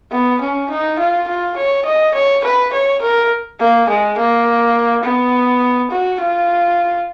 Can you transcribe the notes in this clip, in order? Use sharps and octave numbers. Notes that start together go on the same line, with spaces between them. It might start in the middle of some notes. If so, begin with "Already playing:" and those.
B3
C#4
D#4
F4
F4
C#5
D#5
C#5
B4
C#5
A#4
A#3
G#3
A#3
B3
F#4
F4